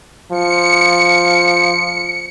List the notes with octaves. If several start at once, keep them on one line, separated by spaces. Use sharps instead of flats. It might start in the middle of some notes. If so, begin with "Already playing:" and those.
F3 C#7